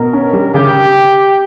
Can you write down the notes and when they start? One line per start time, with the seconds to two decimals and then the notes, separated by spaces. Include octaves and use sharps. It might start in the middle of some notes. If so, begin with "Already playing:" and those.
Already playing: B2 A#4
0.13 C#4
0.33 G3
0.54 C#3 G4